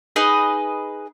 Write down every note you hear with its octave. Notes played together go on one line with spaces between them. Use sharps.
D#4 G#4 B4 D#5